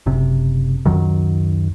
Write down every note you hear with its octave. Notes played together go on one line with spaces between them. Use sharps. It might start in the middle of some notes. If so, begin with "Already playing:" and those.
F#1 C3
C#2 F#2 D#3 F#3